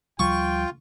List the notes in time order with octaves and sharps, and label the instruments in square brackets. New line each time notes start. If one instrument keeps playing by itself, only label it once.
[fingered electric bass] D2 F3 G3 [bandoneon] F4 [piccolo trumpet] G5 [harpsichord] C#6